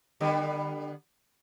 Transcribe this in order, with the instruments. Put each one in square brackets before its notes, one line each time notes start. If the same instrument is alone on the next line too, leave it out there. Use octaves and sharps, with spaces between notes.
[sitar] D3 G3 B3